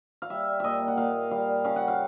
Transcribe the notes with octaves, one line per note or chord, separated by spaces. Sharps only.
F5
G3 E5
A#2 D#5 E5
F#5
A#2 F5
G3 F5
C#3 F5
F#5
F5